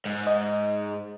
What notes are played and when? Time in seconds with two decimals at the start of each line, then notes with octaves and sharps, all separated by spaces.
0.06 G#2
0.27 D#5